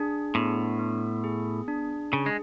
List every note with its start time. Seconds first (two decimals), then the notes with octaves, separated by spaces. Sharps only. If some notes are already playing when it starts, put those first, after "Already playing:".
Already playing: D4 G#4
0.34 A2 B3
0.79 B3
1.24 G#4
1.68 D4
2.13 C#3 G#4
2.26 G#3